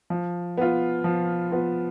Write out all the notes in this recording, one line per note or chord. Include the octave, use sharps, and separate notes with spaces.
F3
B3 F4
F3
B3 F4